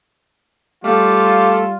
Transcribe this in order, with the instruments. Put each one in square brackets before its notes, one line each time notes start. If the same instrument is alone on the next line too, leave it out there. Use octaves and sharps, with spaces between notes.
[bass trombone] G3 [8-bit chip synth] A3 A4 [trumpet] F4 [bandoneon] G4 F5